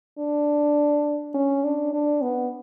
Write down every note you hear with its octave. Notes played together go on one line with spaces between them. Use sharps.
D4
C#4
D4
D4
B3